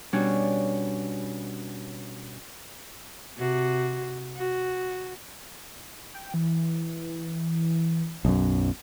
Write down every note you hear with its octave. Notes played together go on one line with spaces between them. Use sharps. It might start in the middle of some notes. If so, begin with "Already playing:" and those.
B2 G3 C#4 D4 C#5
C3 F#4
F#4
G5
E3
B1 F#2